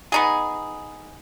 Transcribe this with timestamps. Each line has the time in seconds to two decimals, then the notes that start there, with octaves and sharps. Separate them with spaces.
0.12 B3 D#4 G#4